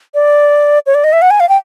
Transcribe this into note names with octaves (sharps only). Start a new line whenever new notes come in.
D5
C#5
D5
D#5
E5
F#5
G#5
F5
G5